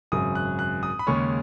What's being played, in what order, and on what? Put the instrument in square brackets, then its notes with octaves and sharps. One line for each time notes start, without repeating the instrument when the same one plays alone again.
[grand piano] G#1 F#2 C#3 F#3 D#6
F#6
F#6
D#6
B5
D#2 C#3 G#3 C#4 C#6